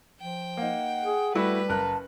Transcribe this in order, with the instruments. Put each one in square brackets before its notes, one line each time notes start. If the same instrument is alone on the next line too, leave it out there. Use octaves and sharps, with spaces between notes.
[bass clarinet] F3 [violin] G5
[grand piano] A#3 D#4 [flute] F#5
[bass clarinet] G#4
[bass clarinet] G3 [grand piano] A3 E4 F#4 [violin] B4
[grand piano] F#1 A#4 F#6 [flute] A5